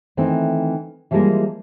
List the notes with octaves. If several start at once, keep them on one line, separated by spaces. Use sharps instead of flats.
D#3 E3 A3 C4
E3 F3 G3 G#3 A#3 A#4